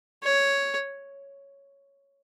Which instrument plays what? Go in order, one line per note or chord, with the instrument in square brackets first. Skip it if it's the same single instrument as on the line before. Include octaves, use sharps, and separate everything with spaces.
[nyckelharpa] C#5